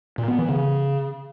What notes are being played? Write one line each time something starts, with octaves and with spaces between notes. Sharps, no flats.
A#2
B3
E3
C#3